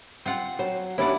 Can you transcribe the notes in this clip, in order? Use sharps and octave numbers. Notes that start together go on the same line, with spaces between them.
C4 F4 F#5
F#3 C5
D#2 C#4 D4 E4 D5 F#5